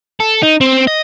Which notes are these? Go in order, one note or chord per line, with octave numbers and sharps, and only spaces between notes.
A4
D#4
C4
D#5